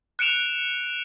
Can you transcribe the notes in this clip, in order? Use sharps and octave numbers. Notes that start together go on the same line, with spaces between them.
F#6 C#7 D7 E7 F7